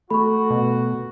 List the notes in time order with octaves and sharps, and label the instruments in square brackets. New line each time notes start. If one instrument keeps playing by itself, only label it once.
[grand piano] A3 [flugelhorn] F#4 [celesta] B5 C#6
[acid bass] B2